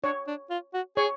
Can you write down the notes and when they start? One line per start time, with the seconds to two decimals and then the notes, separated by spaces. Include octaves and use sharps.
0.04 D4 C#5
0.27 D4
0.50 F4
0.74 F#4
0.97 G#4 C#5